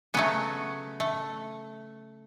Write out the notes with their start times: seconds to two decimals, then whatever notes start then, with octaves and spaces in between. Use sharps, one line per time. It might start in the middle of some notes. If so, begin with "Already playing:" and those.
0.14 C#3 F#3 A3 B3
1.00 A3